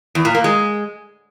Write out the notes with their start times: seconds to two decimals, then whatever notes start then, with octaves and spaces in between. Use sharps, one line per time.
0.15 E2
0.25 A#2
0.35 A#3
0.44 G#3